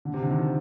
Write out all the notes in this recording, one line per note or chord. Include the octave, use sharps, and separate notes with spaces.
D3
C3
D3
D#3
F3